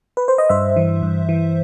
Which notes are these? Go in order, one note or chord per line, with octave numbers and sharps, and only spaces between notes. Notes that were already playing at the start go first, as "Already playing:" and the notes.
B4
C5
D#5
G2 C5 E5
E3
G2
E3